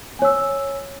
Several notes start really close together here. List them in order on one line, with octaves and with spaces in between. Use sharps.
G#5 C#5 E6